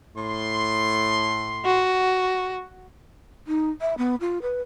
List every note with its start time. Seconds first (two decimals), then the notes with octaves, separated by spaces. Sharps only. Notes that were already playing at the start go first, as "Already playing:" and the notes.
0.16 A2 C6
1.65 F#4
3.47 D#4
3.81 E5
3.98 B3
4.21 F4
4.42 B4